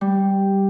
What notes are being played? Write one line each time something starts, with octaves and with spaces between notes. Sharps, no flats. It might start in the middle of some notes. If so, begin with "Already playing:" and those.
G3